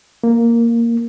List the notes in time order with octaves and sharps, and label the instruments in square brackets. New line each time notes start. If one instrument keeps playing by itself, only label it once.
[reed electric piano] A#3